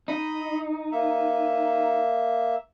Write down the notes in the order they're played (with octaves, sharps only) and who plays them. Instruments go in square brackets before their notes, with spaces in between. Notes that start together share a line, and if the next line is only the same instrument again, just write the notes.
[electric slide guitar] D#4 [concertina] D#5 A#5 B5
[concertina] A#3 E5